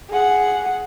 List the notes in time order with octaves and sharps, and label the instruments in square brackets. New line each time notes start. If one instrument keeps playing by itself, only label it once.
[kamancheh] G#4 F#5